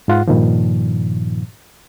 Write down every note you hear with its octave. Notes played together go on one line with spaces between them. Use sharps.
G#2 F4 F#5
G2 A#2 D#3 F3